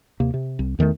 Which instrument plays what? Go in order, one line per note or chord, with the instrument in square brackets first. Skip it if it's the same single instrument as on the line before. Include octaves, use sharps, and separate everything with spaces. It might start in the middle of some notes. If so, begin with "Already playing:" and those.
[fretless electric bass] D#2 C3 A#3
C3
C2
E2 D#3 F3 A3